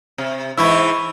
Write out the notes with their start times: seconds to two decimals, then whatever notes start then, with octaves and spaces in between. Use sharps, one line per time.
0.18 C3
0.58 G#2 E3 E4 B5 C#6 E6